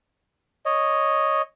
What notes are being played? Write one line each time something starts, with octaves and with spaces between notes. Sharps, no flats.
C#5 D#5